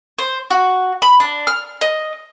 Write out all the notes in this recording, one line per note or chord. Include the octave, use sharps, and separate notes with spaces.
C5
F#4
B5
D4
F6
D#5